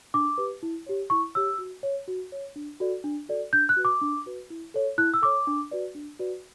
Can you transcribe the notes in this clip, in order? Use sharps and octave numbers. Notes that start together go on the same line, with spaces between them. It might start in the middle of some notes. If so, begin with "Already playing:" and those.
D4 D6
G4 B4
E4
G4 C#5
E4 C#6
G4 C#5 E6
F#4
C#5
F#4
C#5
D4
F#4 A4 D5
D4
F#4 A4 D5
D4 G6
F#6
F#4 B4
D6
D4
F#4 B4
E4
A4 C#5
E4 F#6
E6
A4 C#5 D6
D4
F#4 B4 D5
D4
F#4 B4 D5